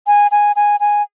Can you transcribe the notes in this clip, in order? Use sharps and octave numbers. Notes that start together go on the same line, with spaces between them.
G#5
G#5
G#5
G#5